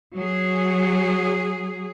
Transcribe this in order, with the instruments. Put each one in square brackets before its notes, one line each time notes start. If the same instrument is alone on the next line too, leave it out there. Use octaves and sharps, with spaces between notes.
[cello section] F#3 G#4